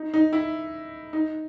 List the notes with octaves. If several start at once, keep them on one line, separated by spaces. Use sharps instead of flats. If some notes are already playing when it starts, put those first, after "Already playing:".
Already playing: D#4
D#4
E4
D#4